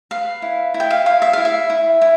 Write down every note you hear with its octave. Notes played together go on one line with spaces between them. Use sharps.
B4 F5
E4
E4
G5
F5
E4 F5
E5
E4 F5
E5
E4
E4